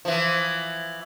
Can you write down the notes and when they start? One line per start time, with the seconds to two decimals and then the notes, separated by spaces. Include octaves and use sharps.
0.05 E3 F3